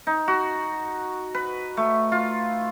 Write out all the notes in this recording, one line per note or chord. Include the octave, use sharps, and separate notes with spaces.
D#4
F#4
B4
A3
F4